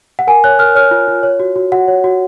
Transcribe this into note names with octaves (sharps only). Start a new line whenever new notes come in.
F#5
A#4 G#5
C#5 F#6
A#4 F6
C#5 F6
F4
F4
C#5
F#4
F#4
F#4 F#5
C#5
F#4